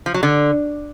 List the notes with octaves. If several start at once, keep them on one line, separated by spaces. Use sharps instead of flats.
F3
F#3
D3